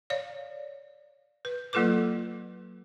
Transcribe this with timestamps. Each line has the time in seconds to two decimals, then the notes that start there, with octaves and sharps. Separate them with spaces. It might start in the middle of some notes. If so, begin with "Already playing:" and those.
0.10 C#5 D5 F5
1.45 B4
1.73 F#3 A#3 F4 A4 B4 D6